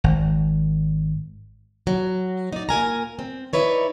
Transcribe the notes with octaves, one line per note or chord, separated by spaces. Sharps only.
G#1
F#3
D#4 D5
A#2 A#4 G#5 A#5
C4
D#4 E4 B4 C#5 D5